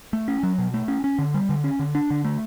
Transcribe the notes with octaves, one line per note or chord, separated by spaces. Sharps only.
A3
C#4
F#3
B2
A3
C#4
C#4
D3
G3
D3
C#4
D3
D4
D3
A3